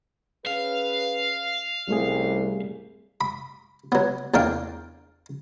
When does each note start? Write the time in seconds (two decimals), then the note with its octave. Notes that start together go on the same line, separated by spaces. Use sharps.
0.46 C#4 G#4 B4 F5
1.88 C2 F3 G3 A3 C#4 G4 G#4
3.21 B5
3.92 F#3 B3
4.34 E2 A#3 D4 F5 G5